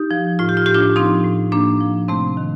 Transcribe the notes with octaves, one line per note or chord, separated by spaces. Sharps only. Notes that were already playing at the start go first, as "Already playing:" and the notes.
Already playing: D#4 G4
F3
A2 F4
G4
F4
A2 G4
D4 F4
F3 C4 D#4
A2
A2 A#3 D4
F3
C3 A3 C4
D#3